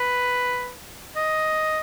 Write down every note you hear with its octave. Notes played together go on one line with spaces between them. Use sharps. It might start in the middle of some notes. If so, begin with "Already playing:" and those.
Already playing: B4
D#5